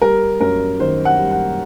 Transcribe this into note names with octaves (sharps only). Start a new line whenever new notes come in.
G3 A#4
F#2 A#4
D#3 C5
F#5
G3
F#5